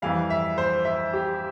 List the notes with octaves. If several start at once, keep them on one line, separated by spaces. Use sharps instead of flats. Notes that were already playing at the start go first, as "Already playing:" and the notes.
F2 E3 G3 F5
E5
C5
E5
G4